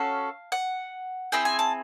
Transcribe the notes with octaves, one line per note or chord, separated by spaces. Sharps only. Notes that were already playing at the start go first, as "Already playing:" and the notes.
Already playing: C#4 F#4 A4 F5
F#5
C4 E4 G#4 G5
G#5
A5